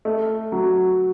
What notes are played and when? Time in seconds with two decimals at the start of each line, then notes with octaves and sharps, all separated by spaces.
0.05 A3
0.52 F#3